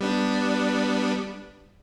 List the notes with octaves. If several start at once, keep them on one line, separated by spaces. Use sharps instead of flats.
G3 B3 D4